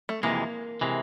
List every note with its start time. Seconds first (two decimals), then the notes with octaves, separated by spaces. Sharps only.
0.09 A3
0.23 F2 C3 E3 G#3 A#3
0.81 C3 E3 G#3